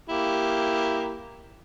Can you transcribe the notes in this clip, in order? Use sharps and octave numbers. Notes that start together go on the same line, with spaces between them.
A#3 E4 G4